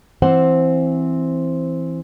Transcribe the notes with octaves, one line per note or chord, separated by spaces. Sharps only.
E3 C4 C5 F#5